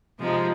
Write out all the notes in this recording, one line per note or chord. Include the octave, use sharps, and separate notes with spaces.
C3 F3 G#3 D#4